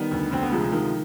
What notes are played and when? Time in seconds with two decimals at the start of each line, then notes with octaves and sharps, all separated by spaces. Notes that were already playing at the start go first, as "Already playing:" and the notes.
Already playing: D#3 G3 B3
0.11 D2
0.31 D2 C4
0.43 B3
0.52 C3 F3 G#3
0.72 D#3 F3 G#3